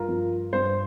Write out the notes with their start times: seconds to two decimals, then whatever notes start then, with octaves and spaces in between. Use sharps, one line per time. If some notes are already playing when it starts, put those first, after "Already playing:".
Already playing: G2 F4 A#4
0.09 F3
0.53 G2 C5